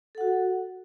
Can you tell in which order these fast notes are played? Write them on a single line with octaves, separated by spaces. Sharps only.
A4 F#5 F#4